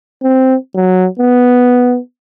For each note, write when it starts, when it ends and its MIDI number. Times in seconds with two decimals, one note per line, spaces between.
0.23 0.55 60
0.75 1.07 54
1.19 1.99 59